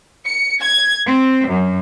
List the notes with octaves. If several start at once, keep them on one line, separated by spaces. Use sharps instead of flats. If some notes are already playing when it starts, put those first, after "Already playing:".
C#7
G#6
C4
F#2